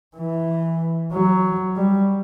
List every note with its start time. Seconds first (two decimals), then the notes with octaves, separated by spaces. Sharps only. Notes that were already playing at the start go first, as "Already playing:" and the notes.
0.17 E3
1.12 F#3
1.76 G3